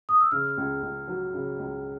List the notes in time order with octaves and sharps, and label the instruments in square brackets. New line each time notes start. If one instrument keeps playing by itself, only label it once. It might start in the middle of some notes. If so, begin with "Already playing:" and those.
[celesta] D#6
E6
[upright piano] C#3 [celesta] F6
[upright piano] C#2
C#2
F#3
C#3
C#2